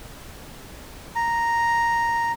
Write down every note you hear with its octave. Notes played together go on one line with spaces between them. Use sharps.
A#5